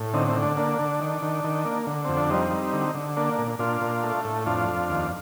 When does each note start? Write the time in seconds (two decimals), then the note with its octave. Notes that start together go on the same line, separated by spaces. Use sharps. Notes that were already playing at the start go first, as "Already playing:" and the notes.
Already playing: A2
0.14 D3 C4 D#4
0.28 C4
0.36 D3
0.42 D4
0.57 A#3 D4
0.79 D3
1.01 D#3
1.22 D#3
1.44 D#3
1.65 A#3
1.87 D3
2.05 F2 C4
2.17 D4
2.30 G3 C4 D#4
2.52 G3
2.73 D3
2.95 D3
3.17 A#3 D4
3.38 A#2
3.59 A#2 D4 F4
3.81 A#2
4.04 A3
4.25 A2
4.46 F2 D4 F4
4.68 F2
4.90 D#2